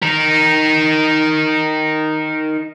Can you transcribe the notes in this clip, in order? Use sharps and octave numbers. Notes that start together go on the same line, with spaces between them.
D#4 A#4